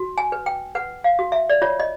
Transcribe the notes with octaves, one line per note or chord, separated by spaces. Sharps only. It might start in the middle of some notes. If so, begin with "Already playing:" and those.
Already playing: F#4
G#5
B4
G5
B4 F#5
F5
F#4
E5
D5
F4 C#5
D#5